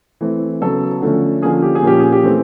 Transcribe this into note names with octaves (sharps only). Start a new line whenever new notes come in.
E3 A3 C4
C#3 F#3 B3 A4
D3 F3 A3 C#4
D3 F3 A#3 C#4 G#4
G4
G#4
A#2 F3 A#3 C#4 G4
G#4
G4
E3 A3 C4